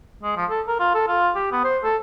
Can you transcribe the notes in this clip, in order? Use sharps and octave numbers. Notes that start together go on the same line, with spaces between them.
G#3
F3
A4
A#4
F4
A4
F4
G4
B3
C5
A4